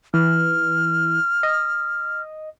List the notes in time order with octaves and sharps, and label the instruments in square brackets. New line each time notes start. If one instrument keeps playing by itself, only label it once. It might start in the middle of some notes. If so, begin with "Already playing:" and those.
[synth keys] E3 [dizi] F6
[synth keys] D#5